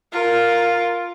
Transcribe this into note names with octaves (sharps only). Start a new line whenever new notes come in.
F4 A#4